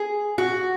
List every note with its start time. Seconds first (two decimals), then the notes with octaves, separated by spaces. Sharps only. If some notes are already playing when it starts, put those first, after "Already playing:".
Already playing: G#4
0.38 F#4